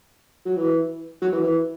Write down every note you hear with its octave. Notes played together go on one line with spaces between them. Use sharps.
F#3
E3
F#3
E3
E3